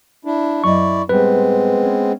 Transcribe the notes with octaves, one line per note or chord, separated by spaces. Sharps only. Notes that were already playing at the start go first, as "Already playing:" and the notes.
D4 E4
F#2 E4 D5 D#5 C#6
A2 G3 G#3 B3 C4 B4
C#4